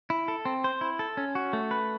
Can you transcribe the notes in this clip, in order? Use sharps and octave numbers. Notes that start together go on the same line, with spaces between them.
E4
A4
C4
C5
E4
A4
C#4
F#4
A3
B4